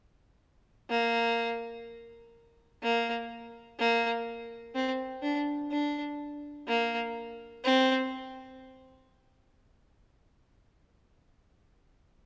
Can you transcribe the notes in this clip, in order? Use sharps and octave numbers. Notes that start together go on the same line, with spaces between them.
A#3
A#3
A#3
C4
D4
D4
A#3
C4